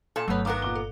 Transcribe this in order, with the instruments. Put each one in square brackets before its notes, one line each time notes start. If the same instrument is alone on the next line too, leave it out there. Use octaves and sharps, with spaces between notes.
[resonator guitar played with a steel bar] A#2 A4 A5
[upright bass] G1 [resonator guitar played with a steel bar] B2 B3 [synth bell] F#3 A3 C#5
[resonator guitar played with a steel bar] D#3 B3 A#4 [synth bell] F5 F#5 [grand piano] A#5 D6 F#6
[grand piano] A#2 D6 G7
[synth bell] A4